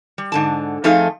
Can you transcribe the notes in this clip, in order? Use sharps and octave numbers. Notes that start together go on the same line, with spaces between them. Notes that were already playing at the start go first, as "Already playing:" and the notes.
G3
G#2 D3 A5
F2 F3 A3 D#4 G#4 F5